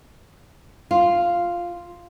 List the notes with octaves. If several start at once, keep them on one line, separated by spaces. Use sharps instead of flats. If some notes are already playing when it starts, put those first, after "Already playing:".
F4